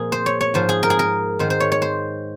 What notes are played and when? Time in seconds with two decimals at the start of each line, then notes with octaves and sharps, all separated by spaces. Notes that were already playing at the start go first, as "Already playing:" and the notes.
Already playing: A#2 F3 G#4
0.12 C5
0.26 C#5
0.41 C#5
0.54 G#2 F3 C5
0.69 G#4
0.83 A#4
0.90 G#4
0.99 A#4
1.39 G#2 D#3 C5
1.50 C5
1.60 C#5
1.72 C#5
1.82 C5